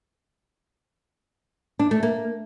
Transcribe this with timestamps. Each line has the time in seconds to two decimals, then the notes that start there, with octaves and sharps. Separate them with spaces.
1.79 D4
1.91 A3
2.03 A#3